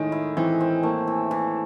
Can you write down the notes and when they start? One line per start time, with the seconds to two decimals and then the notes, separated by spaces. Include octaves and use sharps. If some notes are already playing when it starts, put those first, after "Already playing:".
Already playing: A2 D#3 G#3
0.12 E4
0.37 E3 C4
0.61 C4
0.83 A3 A#3
1.07 E3
1.31 E3